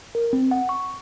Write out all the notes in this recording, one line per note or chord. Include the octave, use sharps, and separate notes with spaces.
A#4
C4
F#5
C#6